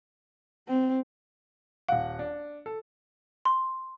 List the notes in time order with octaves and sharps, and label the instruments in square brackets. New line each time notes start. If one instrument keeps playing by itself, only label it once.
[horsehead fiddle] C4
[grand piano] D#1 F#5 [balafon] F5
[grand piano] D4
A4
[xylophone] C6